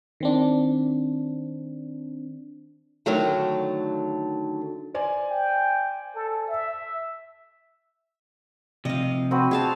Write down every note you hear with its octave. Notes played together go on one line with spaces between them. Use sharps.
D#3 C4 D4
D3 D#3 F#3 A3
C5 D5 G#5
G5
A4
E5
C3 F3 D#5 F5
C4 F#4 B4
G#4 F5 A5